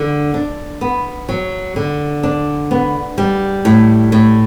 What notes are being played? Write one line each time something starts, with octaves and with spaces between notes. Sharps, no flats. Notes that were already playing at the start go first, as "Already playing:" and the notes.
Already playing: D3
D4
B3
F#3
D3
D4
B3
G3
A2
A2